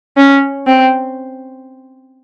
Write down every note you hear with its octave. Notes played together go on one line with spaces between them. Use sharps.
C#4
C4